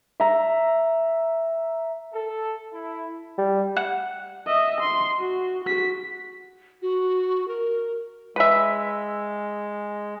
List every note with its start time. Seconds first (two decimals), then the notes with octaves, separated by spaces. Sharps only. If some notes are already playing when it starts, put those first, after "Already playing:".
0.20 E5 A#5
2.14 A4
2.73 E4
3.38 G3
3.76 F#5
4.47 D#5 E5
4.80 C6
5.20 F#4
5.64 F#4 B6
6.82 F#4
7.48 A#4
8.36 G#3 B4 E5